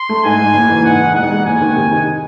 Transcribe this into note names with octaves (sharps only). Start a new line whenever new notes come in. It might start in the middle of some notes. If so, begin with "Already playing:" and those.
Already playing: C6
A3
G#2 G#5
G#2
F#1
E3
G#2 F#5
D#4
E1 F#5
G#3
F#1 G#5
D#3
C3
D#4